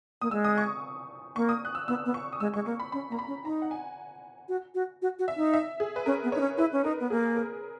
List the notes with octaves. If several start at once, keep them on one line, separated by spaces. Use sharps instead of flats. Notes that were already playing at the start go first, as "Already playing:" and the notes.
A#3 D#6
G#3 E6
D#6
C#6
A#3 C#6
D#6
F#6
E6
B3 E6
B3
C#6
D#6
G#3 E6
G#3 C#6
A#3 C#6
B5
C#4 B5
A#3 A#5
B5
C#4
D#4 A#5
F#5
G#5
F#4
F#4
F#4
F#4
E5
D#4
E5
G#4
B4
C#4 A#4
B3
C#5
D#4
C#4
E4 B4
C#4
D#4 A#4
B3
A#3 G#4
A#4